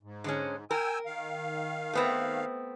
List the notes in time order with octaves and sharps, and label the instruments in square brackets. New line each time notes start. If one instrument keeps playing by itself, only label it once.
[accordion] G#2
[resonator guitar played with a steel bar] D3 G#3 C#4
[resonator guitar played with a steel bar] A#4 [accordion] G5 G#5 E6
[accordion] D#3 F5
[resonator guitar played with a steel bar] A3 B3 C4